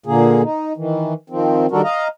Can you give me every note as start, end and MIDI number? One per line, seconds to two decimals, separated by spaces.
0.06 0.42 46
0.06 0.42 50
0.06 0.42 58
0.06 0.42 68
0.43 0.73 63
0.77 1.13 51
0.77 1.13 52
1.30 1.66 51
1.30 1.66 53
1.30 1.66 60
1.71 1.81 51
1.71 1.81 55
1.71 1.81 62
1.71 1.81 66
1.71 1.81 69
1.71 1.81 70
1.84 2.08 75
1.84 2.08 77
1.84 2.08 82